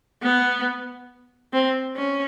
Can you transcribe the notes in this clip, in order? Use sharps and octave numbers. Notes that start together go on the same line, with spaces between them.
B3
C4
C#4